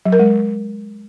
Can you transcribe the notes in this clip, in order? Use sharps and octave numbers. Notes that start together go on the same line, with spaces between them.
F#3
A#4
G#3